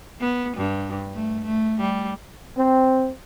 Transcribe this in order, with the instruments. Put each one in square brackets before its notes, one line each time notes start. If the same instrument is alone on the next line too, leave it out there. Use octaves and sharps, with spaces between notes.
[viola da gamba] B3
G2
A3
A3
G3
[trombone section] C4